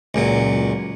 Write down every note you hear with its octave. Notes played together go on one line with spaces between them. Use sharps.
C#2 A#2 F#3